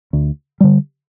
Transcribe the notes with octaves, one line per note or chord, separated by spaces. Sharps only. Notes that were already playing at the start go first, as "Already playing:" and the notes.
D2
D3 G3